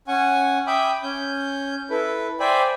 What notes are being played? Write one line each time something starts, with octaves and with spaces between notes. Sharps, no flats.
C#4 F#5 G#5 C#6
E5 G5 B5 D6 D#6
C#4 G6
E4 A4 B4
C5 D5 E5 G5 G#5 B5